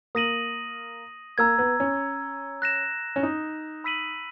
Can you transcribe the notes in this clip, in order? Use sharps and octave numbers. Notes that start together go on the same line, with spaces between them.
A#3 D#6 A#6 D#7 F#7
A#3 A#5 E6 G#6
B3
C#4
F#6 A#6 E7
C#4
D#4
B5 E6 B6 D#7 F#7